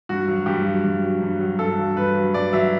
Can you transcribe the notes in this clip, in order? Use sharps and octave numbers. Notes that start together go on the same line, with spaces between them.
G2 F#4
F#3
G2 G4
F#3
G2
F#3
G2
F#3
G2 A4
F#3
G2 B4
F#3
G2 D5
F#3 E5